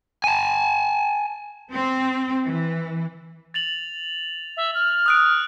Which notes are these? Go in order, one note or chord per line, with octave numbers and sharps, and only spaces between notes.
G#5 A5
C4
E3
A6 F7 F#7
E5
F6
D#6 F#6 D7